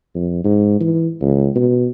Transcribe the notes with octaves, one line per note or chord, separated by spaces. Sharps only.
F2
G#2
E3
C#2
B2